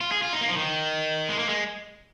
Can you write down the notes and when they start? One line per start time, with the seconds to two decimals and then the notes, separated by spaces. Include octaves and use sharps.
0.01 F4
0.12 G#4
0.22 F4
0.33 D#4
0.41 A#3
0.49 F3
0.57 D#3
1.29 G#3
1.39 A#3
1.49 G#3